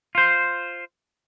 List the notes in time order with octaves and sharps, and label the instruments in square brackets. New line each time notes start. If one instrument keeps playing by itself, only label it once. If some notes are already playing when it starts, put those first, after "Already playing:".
[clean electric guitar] F4 C5